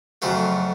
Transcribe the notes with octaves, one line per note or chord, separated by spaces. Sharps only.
F2 C#3 F#3 A3 C5